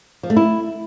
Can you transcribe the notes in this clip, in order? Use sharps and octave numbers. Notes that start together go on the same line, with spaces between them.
F3
A3
E4